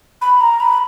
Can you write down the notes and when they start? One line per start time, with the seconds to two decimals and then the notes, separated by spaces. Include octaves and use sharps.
0.21 B5
0.41 A#5
0.60 B5